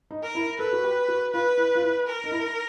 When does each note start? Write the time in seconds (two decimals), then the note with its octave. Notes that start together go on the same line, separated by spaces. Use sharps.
0.11 D#4
0.23 A#4
0.35 E4
0.59 A4 B4
0.73 F#4
0.84 G4
1.08 F#4
1.33 F4 B4
1.57 E4
1.75 F4
1.82 E4
2.07 A#4
2.24 D#4
2.32 E4